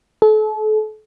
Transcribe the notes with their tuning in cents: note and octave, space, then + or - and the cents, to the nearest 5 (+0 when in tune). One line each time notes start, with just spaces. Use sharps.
A4 -35